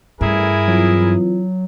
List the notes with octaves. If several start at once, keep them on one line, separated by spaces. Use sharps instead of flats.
A1 G2 E4 G#4 A#4
E3 F#3 C4 F4